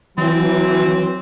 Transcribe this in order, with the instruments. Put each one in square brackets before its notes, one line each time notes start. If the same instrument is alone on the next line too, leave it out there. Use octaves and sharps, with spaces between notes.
[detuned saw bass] E3 [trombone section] F#3 [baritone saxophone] C4